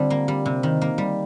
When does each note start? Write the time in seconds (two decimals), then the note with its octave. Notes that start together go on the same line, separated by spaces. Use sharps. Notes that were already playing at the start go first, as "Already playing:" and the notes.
Already playing: D3 G3 C4 F4
0.10 A#3
0.28 G3
0.46 C3
0.63 D#3
0.81 A#3
0.98 G3